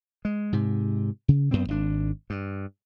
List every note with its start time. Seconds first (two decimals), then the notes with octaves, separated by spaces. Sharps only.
0.25 G#3
0.53 G#2 C3
1.28 C#3
1.51 F#2 A2 B3 C4
1.68 G#1 D4
2.30 G2